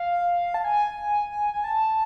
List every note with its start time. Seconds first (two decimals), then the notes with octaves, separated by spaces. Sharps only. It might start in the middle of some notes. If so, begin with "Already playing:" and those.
Already playing: F5
0.54 A5
0.64 G#5
1.54 G#5
1.64 A5